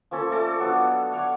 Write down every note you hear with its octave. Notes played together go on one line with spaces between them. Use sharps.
F3 A#3 C#4 A4
A3 A4 D5
F#3 B3 D4 F#5
C#5 D5 F5 F#5